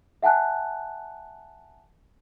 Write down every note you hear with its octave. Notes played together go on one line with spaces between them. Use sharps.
E5 F#5 G#5 A5 F#6